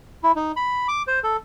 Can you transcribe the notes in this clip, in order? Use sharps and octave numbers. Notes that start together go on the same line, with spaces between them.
E4
D#4
B5
D6
C5
A4